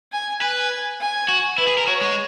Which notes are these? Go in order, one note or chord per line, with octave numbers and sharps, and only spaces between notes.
G#5
B4 G#5
G#5
F#4
E4 B4
G#4
A#4
F#4 C#5
G#3